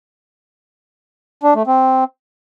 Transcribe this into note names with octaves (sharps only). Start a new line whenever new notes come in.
D4
A3
C4